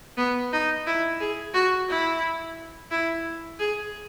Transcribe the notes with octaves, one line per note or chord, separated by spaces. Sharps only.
B3
D#4
E4
G#4
F#4
E4
E4
G#4